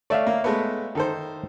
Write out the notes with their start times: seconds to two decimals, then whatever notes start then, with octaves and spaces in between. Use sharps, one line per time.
0.10 A3 C#5 D5 E5 F5
0.27 A#3
0.44 G#3 A3 B3
0.95 D#3 A4 C5